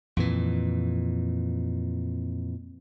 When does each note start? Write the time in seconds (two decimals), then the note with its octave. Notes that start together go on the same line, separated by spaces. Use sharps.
0.17 F2 A#2 E3